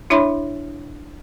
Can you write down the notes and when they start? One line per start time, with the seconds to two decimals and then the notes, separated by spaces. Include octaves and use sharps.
0.10 D4 E4 C#5 E5 B5 C6